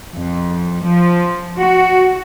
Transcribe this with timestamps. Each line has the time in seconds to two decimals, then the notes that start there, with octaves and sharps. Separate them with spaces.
0.14 F2
0.84 F3
1.57 F#4